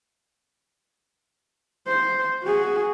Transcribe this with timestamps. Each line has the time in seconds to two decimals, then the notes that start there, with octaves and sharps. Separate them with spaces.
1.88 C5
2.43 F#4 G#4